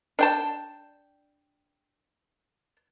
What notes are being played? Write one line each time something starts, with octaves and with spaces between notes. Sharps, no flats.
D4 G5 A5